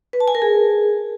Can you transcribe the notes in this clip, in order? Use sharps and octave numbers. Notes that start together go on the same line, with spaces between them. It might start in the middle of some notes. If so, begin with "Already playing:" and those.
B4
A5
G#5
A#4
G#4